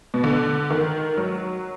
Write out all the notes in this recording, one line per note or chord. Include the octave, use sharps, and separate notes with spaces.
B2
D3
D#3
F#3